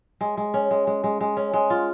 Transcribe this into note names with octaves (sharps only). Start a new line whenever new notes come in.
G#3
G#3
C#4
G#3
G#3
G#3
G#3
C#4
G#3
F4